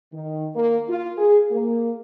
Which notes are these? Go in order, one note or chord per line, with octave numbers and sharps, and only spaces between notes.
D#3
A#3
F4
G#4
A#3